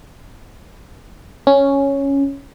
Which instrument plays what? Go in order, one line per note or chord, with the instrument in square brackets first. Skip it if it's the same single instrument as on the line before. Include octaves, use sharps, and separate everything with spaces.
[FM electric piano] C#4